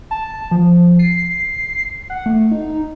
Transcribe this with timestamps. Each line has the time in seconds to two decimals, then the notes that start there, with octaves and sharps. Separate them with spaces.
0.11 A5
0.51 F3
0.99 C7
2.10 F#5
2.26 A3
2.51 D#4